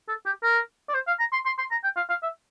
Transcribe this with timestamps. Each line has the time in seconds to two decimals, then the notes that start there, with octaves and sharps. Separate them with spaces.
0.08 A4
0.26 G4
0.43 A#4
0.89 D5
0.94 C5
1.07 F5
1.19 A#5
1.33 C6
1.46 C6
1.58 C6
1.71 A#5
1.84 G5
1.97 F5
2.10 F5
2.23 E5